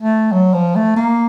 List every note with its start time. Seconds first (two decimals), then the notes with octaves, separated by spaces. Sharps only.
0.01 A3
0.32 F#3
0.54 F3
0.75 A3
0.96 A#3